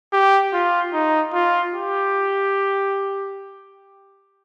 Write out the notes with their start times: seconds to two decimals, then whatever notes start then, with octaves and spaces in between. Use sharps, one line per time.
0.13 G4
0.53 F4
0.93 D#4
1.34 F4
1.74 G4